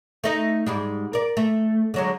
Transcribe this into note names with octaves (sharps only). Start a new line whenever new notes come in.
A3 D#4 D#5
G#2 G3 G#3
A#4 D5
A3
D3 F#3 G#3